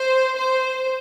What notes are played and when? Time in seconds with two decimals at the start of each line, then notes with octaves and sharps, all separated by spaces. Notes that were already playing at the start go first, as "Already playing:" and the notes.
Already playing: C5
0.38 C5